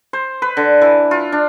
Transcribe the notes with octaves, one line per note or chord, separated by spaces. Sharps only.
C5
B4
D3
E3
F4
D4